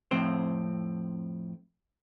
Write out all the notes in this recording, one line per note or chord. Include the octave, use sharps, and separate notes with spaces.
F2 A2 C4 C5